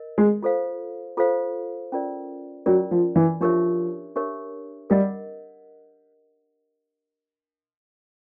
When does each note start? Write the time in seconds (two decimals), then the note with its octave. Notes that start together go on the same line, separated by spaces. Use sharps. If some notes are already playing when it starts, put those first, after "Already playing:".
Already playing: A#4 D#5
0.18 G#3
0.43 F4 A4 C5 F5
1.17 F4 A4 C5 F5
1.92 C#4 F4 A#4 D5
2.66 F#3 C#4 F4 A#4 D5
2.91 F3
3.16 E3
3.40 F3 D4 G4 A#4 C#5 E5
4.16 D4 G4 A#4 C#5 E5
4.90 G3 A#4 D#5 F#5